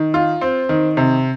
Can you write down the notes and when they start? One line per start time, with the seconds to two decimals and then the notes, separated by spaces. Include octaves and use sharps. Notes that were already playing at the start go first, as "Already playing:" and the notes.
Already playing: D#3
0.14 F4
0.41 C4
0.69 D#3
0.97 C3